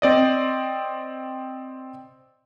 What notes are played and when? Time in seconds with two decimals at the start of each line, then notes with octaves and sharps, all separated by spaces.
0.02 C4 D5 D#5